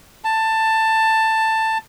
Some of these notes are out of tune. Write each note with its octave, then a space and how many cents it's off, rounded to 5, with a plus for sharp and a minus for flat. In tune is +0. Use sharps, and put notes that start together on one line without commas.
A5 +10